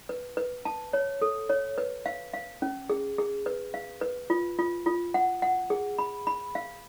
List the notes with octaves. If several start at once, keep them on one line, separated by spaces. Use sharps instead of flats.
B4
B4
A5
C#5
A4
C#5
B4
F5
F5
C#4
G#4
G#4
B4
F5
B4
F4
F4
F4
F#5
F#5
G#4
B5
B5
F5